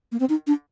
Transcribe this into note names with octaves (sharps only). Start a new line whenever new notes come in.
A#3
C4
D#4
D4